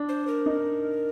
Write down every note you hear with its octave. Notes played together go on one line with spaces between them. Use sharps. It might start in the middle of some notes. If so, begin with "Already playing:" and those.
Already playing: D4
C5
A#4
D#4